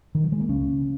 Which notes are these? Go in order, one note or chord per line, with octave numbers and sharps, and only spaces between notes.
D#3
F#3
G#3
A#3
C#2 C#3 C#4
C#3